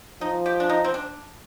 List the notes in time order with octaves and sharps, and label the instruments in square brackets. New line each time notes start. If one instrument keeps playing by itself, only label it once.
[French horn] F3 [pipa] D#4
[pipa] G4
D4
D#4
C4
D4